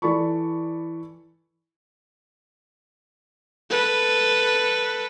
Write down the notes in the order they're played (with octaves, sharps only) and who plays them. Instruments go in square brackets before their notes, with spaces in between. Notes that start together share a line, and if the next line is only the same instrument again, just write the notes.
[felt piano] E3 A4 D5 B5 C#6
[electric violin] A4 B4